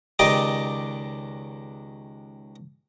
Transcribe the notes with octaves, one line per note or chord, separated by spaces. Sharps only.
C#2 D#3 G4 D5 D#5 D6